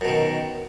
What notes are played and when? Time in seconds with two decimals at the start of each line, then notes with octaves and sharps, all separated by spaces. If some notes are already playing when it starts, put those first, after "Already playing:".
0.01 F#2
0.05 B2
0.08 D#3